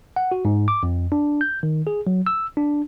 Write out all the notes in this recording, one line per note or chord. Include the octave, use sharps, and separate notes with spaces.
F#5
F#4
G#2
D6
F2
D4
G6
D#3
G#4
F#3
E6
D4